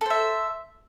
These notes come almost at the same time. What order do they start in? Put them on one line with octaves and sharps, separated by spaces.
A4 C5 E5